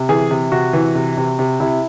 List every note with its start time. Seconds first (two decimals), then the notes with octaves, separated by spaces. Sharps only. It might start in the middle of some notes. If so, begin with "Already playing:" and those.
Already playing: C3
0.09 E3 G#4
0.31 C3
0.52 C3 F#4
0.73 E3
0.95 C3
1.17 C3
1.39 C3
1.60 C3 E4